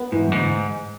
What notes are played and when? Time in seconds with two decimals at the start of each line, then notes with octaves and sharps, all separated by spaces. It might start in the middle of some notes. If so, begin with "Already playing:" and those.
Already playing: B3
0.12 G#2 E3
0.27 F#2
0.32 D2 G#2